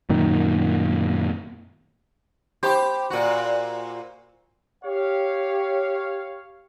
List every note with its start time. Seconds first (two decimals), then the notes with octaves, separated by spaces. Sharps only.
0.09 F#2 A#2 D#3
2.63 G4 C5 B5 D6
3.10 A#2 F#4
4.84 G4 C#5 F5